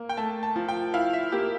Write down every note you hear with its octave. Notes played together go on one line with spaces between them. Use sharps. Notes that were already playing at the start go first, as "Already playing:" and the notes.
Already playing: A#3
G5
A3 A5
A5
F3
G5
E4 F5
E5
A#3 G4